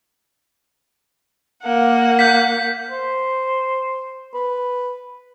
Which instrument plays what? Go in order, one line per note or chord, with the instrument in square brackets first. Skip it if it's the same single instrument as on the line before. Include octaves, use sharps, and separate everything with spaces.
[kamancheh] A#3 F#5
[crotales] G6 B6
[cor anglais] C5
B4